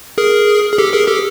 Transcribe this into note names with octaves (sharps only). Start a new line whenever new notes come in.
G#4 A#4
G#4
G4 A4
G#4 A#4
G4 A4